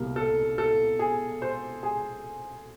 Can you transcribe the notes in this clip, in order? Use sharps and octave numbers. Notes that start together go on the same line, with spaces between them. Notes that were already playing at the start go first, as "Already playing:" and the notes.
Already playing: C2 B2 G3 A#3 A#4
A4
A4
G#4
C5
G#4